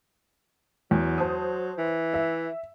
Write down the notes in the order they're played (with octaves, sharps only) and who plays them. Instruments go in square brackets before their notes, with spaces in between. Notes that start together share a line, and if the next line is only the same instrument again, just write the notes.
[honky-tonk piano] E2 [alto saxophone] F#3
[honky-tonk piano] C5 A5 D#6
[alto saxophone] E3
[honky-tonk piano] E5